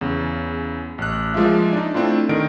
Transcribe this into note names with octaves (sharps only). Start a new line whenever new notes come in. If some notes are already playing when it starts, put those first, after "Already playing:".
E2 C#3
A1 F#6
F3 G#3 A#3 F4 E5
D4 D#4
A3 C4 D4 E4 F4
D3 D#3 D#4 A#4 D7